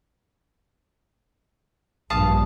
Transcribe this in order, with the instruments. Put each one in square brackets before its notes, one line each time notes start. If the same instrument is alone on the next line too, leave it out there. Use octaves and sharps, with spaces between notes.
[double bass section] A#1 G2 [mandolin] F5 A5 D#6